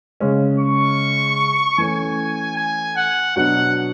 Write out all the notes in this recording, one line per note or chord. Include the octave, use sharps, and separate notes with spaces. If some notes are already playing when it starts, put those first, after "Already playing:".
C#3 G#3 C#4
C#6
E3 A3 C#4 G#5
G#5
F#5
B2 F#3 B3 D4 F#4 F#5